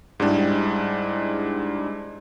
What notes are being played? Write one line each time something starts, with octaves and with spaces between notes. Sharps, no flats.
G#2 G3 G#3 D4 E4 G4